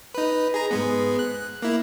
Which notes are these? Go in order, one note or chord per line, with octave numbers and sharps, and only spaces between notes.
D#4 B4
G#4 A#5
G#2 G#3 B3
F#6
A#3 E4